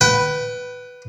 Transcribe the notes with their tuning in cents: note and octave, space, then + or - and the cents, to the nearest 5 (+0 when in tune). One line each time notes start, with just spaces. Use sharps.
B4 +0 G5 -40